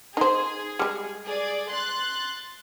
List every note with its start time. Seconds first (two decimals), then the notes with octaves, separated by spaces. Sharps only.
0.17 D#4 G#4 C5
0.79 G3 G#3
1.26 G#4 D5
1.70 C6 F#6 A6